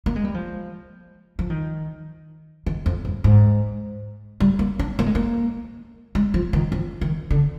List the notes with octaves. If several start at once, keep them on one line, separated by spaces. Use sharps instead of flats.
A#3
G#3
G3
F3
F3
D#3
D#3
F2
G2
G#2
G3
A#3
D4
A#3
G#3
A#3
G#3
F3
D#3
F3
D#3
D3